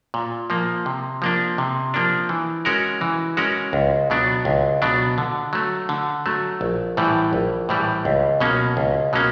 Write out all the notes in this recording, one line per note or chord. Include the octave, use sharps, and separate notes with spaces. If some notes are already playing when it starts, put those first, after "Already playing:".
A#2
F3 A#3
C3
F3 A#3 D4
C3
F3 A#3 D4
E3
G#3 C#4 F#4 A#4
E3
G#3 C#4 F#4 A#4
C#2
B2 F#3 B3 D4
C#2
B2 F#3 B3 D4
D3
F#3 A3
D3
F#3 A3
A#1
A2 E3 G3
A#1
A2 E3 G3
C#2
B2 F#3 A#3 C#4
C#2
B2 F#3 A#3 C#4